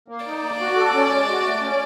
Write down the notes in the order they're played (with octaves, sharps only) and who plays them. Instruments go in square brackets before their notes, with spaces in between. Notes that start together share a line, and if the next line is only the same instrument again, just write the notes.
[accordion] A#3
[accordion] D#4 [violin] D5
[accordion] A#3
F#4
A4
C#4
G#3
F#4
A3
C#4